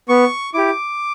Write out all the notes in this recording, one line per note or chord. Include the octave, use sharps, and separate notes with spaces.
B3 C#6
E4 G4 D6